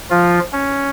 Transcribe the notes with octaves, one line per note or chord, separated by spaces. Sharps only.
F3 F4
C#4